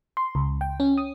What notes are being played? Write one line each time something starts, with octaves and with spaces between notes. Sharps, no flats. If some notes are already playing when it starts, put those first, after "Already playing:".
C6
C#2
G5
C#4
D#6